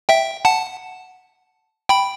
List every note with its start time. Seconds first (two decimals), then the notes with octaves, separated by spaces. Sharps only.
0.09 E5 G5
0.45 F#5 A5
1.89 G5 B5